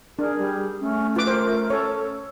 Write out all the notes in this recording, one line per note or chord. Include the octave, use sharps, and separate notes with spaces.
D4 G#4 A#4
G3
A3 C#4
F4 B4 D6
A#4 C5
C#4 A4 C#5